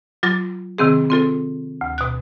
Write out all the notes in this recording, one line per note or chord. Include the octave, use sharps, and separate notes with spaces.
F#3 F4 D6 A6 A#6
C3 D#3 C4 G#4
C4 F4 A4
D2
B2 F#6